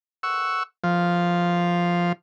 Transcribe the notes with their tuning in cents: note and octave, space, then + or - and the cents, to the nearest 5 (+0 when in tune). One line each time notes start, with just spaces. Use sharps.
F#5 +0 C#6 +0 E6 +0
F3 +0 F5 +0